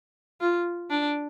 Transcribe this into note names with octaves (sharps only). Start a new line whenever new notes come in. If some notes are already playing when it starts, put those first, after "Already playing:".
F4
D4